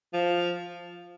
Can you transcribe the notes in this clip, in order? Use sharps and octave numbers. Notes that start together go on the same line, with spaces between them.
F3